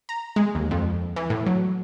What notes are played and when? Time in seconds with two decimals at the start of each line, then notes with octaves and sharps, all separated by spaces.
0.09 A#5
0.36 G#3
0.55 D#2
0.71 F2
1.16 E3
1.30 A2
1.46 F#3